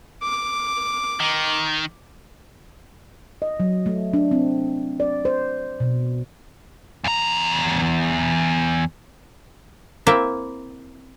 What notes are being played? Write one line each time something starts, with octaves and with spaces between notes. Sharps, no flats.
D6
D#3
D#5
F#3
A3
D4
C4
D5
C5
B2
E2 A#5
A#3 C4 E4 E5 F5 G5